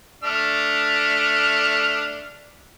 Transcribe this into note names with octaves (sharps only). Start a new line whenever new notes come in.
A3 D4 F6